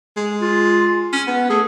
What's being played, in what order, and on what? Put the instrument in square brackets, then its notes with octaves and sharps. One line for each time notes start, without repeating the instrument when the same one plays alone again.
[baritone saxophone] G#3
[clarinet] F4
[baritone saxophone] C#4
[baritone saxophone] B3 [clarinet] F#5
[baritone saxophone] A3 [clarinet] G#4